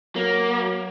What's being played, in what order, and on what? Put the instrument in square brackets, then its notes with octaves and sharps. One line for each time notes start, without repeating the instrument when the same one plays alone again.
[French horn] F#3 [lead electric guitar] A#3